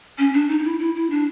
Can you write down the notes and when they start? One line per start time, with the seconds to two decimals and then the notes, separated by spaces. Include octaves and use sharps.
0.18 C#4
0.34 D4
0.49 D#4
0.59 D#4
0.64 E4
0.80 E4
0.95 E4
1.10 D4